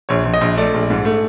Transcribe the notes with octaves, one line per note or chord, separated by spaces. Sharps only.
A#1 C#5
A#1
D#5
A#1
A3 D5
A#1
G#2
A3